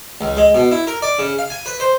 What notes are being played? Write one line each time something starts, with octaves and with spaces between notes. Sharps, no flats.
C#2
G#3
B2
E4
A#4
D5
C#3
F5
G#5
B4
C5